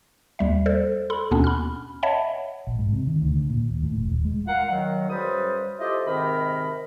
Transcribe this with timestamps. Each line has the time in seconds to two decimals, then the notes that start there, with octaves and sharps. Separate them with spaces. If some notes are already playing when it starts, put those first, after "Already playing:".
0.39 D#2 G3 E5
0.66 A4 C5 D5
1.10 A4 B5 C6
1.31 D#2 B2 B3 C#4 D4
1.44 B5 F6
2.03 C#5 D#5 E5 F#5 A5 B5
2.67 A#1
2.79 G#2
2.92 C3
3.07 D#3
3.21 D2
3.34 D3
3.50 A#2
3.70 D#2
3.83 A2
3.96 E1
4.09 D#1
4.25 G#3
4.47 F4 A#4 F5 F#5
4.70 D#3 F#3
5.09 F#2 C#3 G3 B4 C5 D#6
5.79 E4 F4 G4 A4 C5 D#5
6.06 G#2 C3 D#3 A#4 D#5 B5